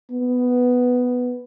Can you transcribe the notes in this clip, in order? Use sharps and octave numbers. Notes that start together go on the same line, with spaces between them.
B3